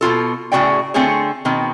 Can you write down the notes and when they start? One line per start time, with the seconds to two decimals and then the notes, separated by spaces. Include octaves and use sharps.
0.01 B2 E4 F4 A4
0.52 A2 C#3 F#4 G#4 D5 G5
0.94 D3 A3 C4 F4 G#4 C#5
1.45 B2 D#3 C4